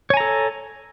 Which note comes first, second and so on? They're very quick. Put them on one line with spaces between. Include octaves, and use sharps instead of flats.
C#5 G#5 A#5 A4